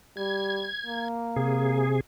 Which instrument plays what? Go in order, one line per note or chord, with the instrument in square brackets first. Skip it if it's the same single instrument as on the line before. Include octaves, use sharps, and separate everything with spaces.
[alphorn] G3 [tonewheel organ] G#6
[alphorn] A#3
[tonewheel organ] C3 G#4